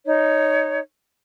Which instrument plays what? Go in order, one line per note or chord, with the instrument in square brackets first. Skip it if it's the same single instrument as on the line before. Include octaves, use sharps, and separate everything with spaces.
[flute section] D#4 C#5